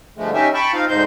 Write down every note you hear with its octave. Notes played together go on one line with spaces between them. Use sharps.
G2 D3 F3 G#3 A3
C#4 D#4 G4 E5
G5 A5 B5 C#6
C4 D#4 F4 F5
D2 G#2 D3 D#4 C5 G6